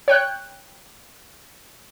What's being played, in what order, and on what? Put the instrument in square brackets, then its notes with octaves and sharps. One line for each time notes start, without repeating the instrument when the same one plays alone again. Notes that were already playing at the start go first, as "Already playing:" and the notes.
[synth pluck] C#5 G5 F#6